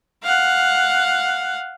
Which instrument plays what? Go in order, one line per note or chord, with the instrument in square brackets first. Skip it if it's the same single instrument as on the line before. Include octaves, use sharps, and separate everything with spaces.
[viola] F5 F#5